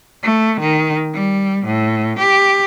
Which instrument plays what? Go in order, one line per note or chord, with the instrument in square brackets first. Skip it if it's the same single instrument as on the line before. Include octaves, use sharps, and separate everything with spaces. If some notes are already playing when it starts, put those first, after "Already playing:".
[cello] A3
D#3
G3
A2
G4